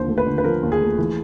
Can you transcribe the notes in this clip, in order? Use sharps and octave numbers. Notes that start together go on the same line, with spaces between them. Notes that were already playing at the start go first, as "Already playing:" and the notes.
Already playing: D#2 D3 F3 C5
A3
B4
D3
B4
F3 A#4
D#2
G#4
A3
E3